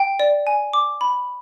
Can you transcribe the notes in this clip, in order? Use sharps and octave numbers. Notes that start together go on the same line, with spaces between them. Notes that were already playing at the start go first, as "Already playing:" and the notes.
Already playing: G5
D5
G#5
D6
B5